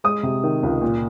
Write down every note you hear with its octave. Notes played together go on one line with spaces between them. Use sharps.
G#3 D#6
C3
D#3
C#2
A#2